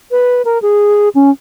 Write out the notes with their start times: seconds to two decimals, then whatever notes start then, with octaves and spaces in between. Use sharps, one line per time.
0.11 B4
0.45 A#4
0.62 G#4
1.15 C#4